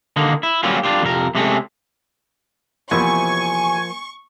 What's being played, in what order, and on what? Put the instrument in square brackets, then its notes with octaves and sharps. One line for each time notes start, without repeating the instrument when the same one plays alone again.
[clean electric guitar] D3 D#3 A#3
E4
F#3 G3 A#3 C4 C#4 F4
D4 F4 G4
F2 C3 A#4
C3 G#3 A3 C4 C#4
[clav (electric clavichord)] E2 C3 E4 [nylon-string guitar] F3 A#3 [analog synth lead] G#5 [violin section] C#6